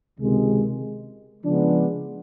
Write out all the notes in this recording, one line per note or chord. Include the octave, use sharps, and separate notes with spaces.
C#2 C3 D#3 G#3
C#3 F3 G#3 B3 D4